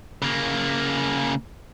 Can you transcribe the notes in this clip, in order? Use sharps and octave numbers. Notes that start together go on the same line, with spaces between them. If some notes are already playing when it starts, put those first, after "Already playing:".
C#3 A#3